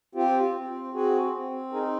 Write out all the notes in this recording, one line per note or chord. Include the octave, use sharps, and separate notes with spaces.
C4 F4 G4
C4
C4 F#4 G#4
C4
D#4 G#4 A#4